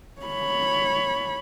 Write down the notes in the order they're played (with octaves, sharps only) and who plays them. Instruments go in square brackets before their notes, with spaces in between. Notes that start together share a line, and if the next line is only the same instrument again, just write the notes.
[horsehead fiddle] C#5 B5